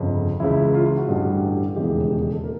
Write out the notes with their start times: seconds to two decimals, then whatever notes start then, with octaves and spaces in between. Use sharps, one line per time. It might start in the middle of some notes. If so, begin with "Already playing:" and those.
Already playing: G1 F2 C#3
0.40 C#2 C#3 E3 E4
0.74 F4
0.85 F4
0.97 F#4
1.08 A1 G2 D3 G3
1.76 E1 D#2 C#3 E3 G#3 G4
2.10 G4
2.22 G4
2.32 A4
2.44 A#3 A#4